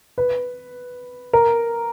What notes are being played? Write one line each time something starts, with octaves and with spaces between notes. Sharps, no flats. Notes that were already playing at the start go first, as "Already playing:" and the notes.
B4
A#4